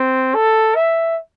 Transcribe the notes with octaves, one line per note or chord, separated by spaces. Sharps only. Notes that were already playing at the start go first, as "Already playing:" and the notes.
Already playing: C4
A4
E5